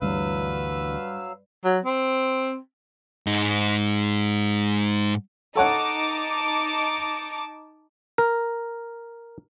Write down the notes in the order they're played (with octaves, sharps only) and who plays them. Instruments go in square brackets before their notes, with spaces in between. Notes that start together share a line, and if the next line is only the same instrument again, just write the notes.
[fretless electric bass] D2 E3 [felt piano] G2 [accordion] F#3 F5 E6 [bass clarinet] B4
[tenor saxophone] F#3
C4
[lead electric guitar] G#2 D#4
[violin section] D#4 A5 D6 [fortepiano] A4 C#5 F#5
[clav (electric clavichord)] A#4